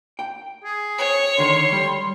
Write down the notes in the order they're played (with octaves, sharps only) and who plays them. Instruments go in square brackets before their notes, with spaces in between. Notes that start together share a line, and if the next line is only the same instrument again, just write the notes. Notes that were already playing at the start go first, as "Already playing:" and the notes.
[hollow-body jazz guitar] G5
[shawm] G#4
[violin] C#5
[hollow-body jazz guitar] D3 D#3 [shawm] C6
[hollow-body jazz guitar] G3